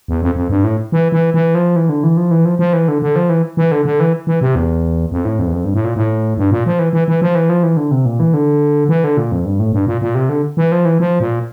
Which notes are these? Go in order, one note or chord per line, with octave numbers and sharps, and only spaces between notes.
E2
F2
F2
G2
A2
E3
E3
E3
F3
E3
D3
E3
F3
E3
F3
F3
E3
D3
D3
F3
E3
E3
D3
D3
E3
E3
C3
E2
F2
A2
F2
E2
F2
G2
A2
A#2
A2
G2
A#2
F3
E3
E3
E3
F3
E3
F3
E3
D3
C3
A#2
E3
D3
E3
D3
A#2
F2
G2
A2
G2
A#2
A#2
C3
D3
E3
F3
E3
F3
A#2